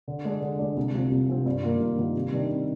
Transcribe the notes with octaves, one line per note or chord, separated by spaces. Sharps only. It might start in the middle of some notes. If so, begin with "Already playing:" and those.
D3
G#3 D4
D3
G#3 D4
C2
C3 F3 C4
C2
C3 F3 C4
G2
D#3 A#3 F4
G2
D#3 A#3 F4
C3
D#3 G3 D4
C3